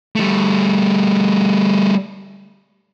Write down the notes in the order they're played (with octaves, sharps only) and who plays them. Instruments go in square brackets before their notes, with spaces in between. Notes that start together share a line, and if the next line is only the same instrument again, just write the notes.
[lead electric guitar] G3 A3